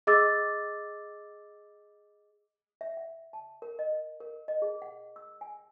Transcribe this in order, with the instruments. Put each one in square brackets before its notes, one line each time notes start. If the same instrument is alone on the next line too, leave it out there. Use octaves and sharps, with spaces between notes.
[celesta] G#4 D#5 D6 E6 A6
[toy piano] E5
F#5
A5
A#4
D#5
A#4
D#5
G#4
F#5
E6
G#5